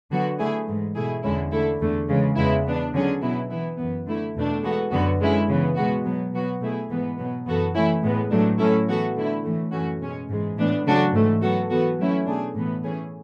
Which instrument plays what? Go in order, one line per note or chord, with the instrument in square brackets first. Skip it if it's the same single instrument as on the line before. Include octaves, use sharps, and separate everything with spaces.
[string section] D3 F#3 B3 F#4
D3 A3 E4 G#4
G#2 E3 G#3
B2 A3 E4 G#4
E2 D3 G#3 C#4 E4
D3 A3 E4 A4
E2 D3 A3
C#3 E3 G#3
E2 C#3 G#3 B3 E4
E3 B3 D4
D3 F#3 C#4 G#4
B2 F#3 B3 E4
E3 B3 E4
F#2 E3 B3
D3 A3 E4
E2 B2 A3 D4
E3 G#3 B3 F#4 A4
F#2 D3 F#3 B3 F#4
D3 G#3 C#4 E4
C#3 E3 B3
B2 G#3 B3 F#4
B2 F#3 B3
B2 F#3 B3 F#4
B2 A3 E4 G#4
G#2 E3 B3
B2 F#3 B3
F#2 E3 B3 F#4 A4
E3 A3 C#4 E4
A2 G#3 B3
A2 F#3 A3 D4
A2 F#3 C#4 E4 A4
E3 B3 F#4 A4
D3 A3 E4
A2 E3 A3
F#2 E3 A3 C#4 F#4
B2 G#3 C#4
G#2 E3 G#3
A2 E3 B3 D4
C#3 F#3 A3 D4 F#4
G#2 E3 A3
F#3 B3 F#4 A4
E3 B3 F#4 A4
F#3 A3 C#4 E4
B2 A3 D4 G#4
A2 E3 B3
E3 A3 C#4 G#4